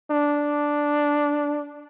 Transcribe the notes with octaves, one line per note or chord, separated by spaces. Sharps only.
D4